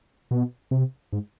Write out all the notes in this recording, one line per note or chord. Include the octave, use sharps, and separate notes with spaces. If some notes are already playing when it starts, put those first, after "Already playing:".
B2
C3
G#2